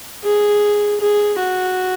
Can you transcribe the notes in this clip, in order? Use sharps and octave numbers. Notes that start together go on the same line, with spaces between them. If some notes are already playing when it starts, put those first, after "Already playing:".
G#4
G#4
F#4